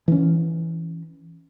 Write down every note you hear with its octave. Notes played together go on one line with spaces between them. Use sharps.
E3 C#4